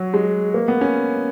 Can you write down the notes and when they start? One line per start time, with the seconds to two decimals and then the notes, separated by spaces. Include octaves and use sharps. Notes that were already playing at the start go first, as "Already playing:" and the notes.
Already playing: F#3
0.14 G#3
0.54 A#3
0.68 B3
0.81 C#4